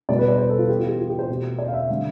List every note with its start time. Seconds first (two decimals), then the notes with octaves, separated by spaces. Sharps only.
0.09 B2 G3 B3 D5
0.19 B4
0.28 D5
0.38 C5
0.49 A4
0.59 F4
0.68 E3 B3 G4
0.79 F4
0.88 G4
0.99 F4
1.09 G4
1.19 C5
1.29 B2 A3 C4
1.59 D5
1.68 F5
1.74 E5
1.89 D3 G3 C4 F5